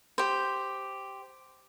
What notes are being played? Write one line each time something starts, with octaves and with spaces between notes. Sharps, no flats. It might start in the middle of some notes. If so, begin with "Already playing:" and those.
G4 C5